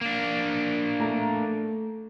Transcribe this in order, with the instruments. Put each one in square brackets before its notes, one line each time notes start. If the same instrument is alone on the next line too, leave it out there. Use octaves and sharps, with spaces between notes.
[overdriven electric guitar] A#3 D4
[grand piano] A3 A#5